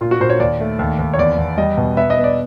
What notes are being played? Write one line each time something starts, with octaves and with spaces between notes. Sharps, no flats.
A#2 F4
F#4
A#2 C5
C#5
D#2 D5
A3
D#2
D#2
C#5
E2 D5
E2
G3 D#5
B2
B3 E5
D#5
B3
D5